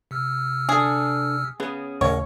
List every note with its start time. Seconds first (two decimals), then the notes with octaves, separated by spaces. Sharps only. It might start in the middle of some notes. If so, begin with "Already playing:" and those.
0.11 C3 E6 F6
0.69 D4 G#4 A4
1.60 B3 C#4 G#4
2.01 D#2 A2 C#3 A#4 C#5 D#5 F#5